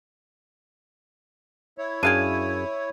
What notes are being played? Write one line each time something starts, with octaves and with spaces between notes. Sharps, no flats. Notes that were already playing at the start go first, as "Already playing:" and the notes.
E4 C#5
F#2 D4 G#4 F5 G5 G#6 D#7